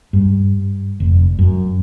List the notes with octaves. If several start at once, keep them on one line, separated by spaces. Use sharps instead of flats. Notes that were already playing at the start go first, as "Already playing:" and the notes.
G2
F1
F#2